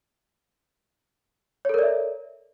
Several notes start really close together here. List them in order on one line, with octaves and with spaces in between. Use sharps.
C#5 A4 A#4 D5 E5